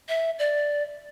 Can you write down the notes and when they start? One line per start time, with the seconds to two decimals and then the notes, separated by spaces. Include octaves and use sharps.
0.09 E5
0.39 D5